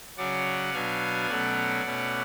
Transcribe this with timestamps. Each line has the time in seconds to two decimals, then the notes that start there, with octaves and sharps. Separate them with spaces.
0.17 C#3 F#3 C#4 D5 F#5
0.73 B2 F#3 B3 D4 F5 G#5
1.29 B2 F#3 A3 C#4 D5 F#5
1.84 B2 A3 C#4